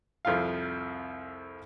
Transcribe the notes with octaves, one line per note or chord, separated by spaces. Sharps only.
C2 F2 F4 F5